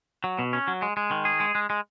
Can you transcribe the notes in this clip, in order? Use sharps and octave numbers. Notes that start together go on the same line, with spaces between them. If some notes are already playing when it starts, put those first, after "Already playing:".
F#3
B2
C#4
F#3
G#3
G#3
D#3
G#4
G#3
G#3
G#3